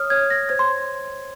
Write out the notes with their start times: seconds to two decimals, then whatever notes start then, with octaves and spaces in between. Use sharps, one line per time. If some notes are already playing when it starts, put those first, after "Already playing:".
Already playing: C#5 D#6 F6
0.10 C#5 G#6
0.30 A#6
0.49 C5 G#6
0.59 C6